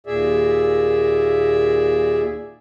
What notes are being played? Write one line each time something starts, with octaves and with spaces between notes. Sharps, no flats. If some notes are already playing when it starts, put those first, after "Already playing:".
D#2 A#2 G#4 D5 E5